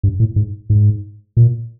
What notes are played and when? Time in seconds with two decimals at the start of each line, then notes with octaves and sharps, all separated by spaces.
0.03 G2
0.20 A2
0.36 G#2
0.70 G#2
1.37 A#2